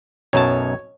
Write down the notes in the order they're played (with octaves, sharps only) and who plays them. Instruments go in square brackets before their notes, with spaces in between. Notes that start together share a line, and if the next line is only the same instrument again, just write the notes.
[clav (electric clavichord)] B1 F#2 A5 [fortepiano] C#5